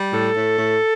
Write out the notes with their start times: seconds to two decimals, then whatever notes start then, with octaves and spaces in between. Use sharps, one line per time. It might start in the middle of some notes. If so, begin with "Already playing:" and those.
Already playing: G3
0.12 A2 A4
0.36 A2
0.58 A2